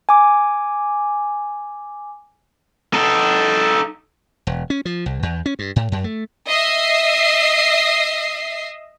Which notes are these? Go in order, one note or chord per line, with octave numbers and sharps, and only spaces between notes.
G#5 D6
D#4 A4
E1
C#4
F3
C2
E2
C#4
G2
A2
F#2
A3
D#5 E5 C7